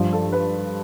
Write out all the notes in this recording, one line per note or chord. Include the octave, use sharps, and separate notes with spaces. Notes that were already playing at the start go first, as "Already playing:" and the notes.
Already playing: G2 F3
A4
B4